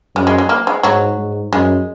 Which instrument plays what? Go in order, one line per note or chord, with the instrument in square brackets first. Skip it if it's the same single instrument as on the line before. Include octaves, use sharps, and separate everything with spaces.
[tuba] F#2 [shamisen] G#3
[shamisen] G#3
G#3
A#3
G#3
[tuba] G#2 [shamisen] F#3
[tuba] G#2
[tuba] F#2 [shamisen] G#3